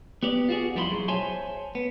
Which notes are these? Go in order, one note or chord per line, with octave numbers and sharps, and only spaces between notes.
B3 G4 D5
F4 F#4 G#4
F2 G3 E4 C5 B5 C6
B1 F#3 G#4
C5 C#5 E5 G#5 A5 C6
B3